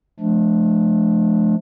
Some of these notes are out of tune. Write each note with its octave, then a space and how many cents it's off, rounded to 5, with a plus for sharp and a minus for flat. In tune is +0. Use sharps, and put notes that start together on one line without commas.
F3 +0 A3 -35 D4 +0